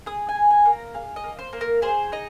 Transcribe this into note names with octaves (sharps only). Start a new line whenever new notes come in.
G#4 D#6
G#5
G#4
G#5
A#3
A#5
G#4 F5
D#5
A#3
C5
A#3
A#4
G#4 C5
D#4 D#5